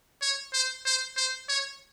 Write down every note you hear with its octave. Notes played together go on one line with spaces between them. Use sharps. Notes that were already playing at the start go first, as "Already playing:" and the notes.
C#5
C5
C5
C5
C#5